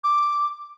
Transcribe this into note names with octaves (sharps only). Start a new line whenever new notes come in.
D6